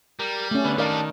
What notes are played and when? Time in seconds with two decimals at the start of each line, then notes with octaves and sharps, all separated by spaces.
0.19 G3 A#4
0.51 A3 C#4
0.64 D3 B3
0.78 D#3 G3 D4 A#4 D5 F5